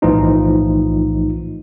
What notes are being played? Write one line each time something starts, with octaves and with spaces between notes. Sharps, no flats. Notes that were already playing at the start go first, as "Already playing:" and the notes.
B1 A2 E3 F3 D#4 F4